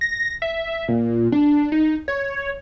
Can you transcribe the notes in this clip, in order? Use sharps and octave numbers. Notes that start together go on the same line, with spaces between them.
A#6
E5
A#2
D4
D#4
C#5